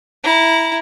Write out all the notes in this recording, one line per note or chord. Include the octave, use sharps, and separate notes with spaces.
E4 A#5